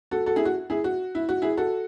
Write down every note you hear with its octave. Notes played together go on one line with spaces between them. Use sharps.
F#4 A4
F#4 A4
E4 G#4
F#4
E4 G#4
F#4
E4
F#4
E4 G#4
F#4 A4